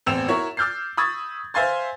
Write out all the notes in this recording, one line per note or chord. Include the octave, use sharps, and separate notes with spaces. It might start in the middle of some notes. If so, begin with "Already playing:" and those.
A1 E2 C4 E6 E7 F7
E4 F#4 A#4 C#5
D6 E6 F6 G6 A6 C7
B5 C#6 D#6 E6 G#6 A6
C5 E5 F5 G#5 C6 A6